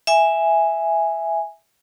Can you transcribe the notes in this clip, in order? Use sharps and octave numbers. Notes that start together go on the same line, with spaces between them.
E5 G#5